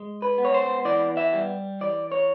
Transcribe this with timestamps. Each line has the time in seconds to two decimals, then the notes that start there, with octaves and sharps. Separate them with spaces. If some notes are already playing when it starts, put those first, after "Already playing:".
Already playing: G#3
0.22 B4
0.38 B3
0.45 C#5
0.54 C5
0.85 E3 D5
1.17 E5
1.33 G3
1.81 E3 D5
2.12 C#5